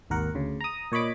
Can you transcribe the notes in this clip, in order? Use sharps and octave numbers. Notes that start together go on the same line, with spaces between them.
G#1 D#2 A#4 F#5
D2 C#3
A#5 D#6
A#2 C#5 D#5 B5 D6